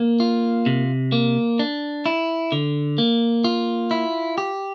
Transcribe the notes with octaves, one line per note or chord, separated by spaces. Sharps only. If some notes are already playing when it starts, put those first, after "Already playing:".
Already playing: A#3
F4
C3
A#3
D4
E4
D3
A#3
F4
E4
G4